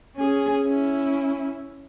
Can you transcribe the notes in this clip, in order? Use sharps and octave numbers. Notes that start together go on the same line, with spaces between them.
C#4 G#4
C#4 E4